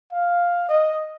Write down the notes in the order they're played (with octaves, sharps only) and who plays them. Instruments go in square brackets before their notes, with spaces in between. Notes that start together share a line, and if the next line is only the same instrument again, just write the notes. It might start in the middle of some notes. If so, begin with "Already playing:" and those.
[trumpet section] F5
D#5